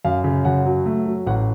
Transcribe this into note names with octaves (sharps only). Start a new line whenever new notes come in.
F#2 F5
C#3
F#2 F#5
F#3
A3
F#3
A1 F#5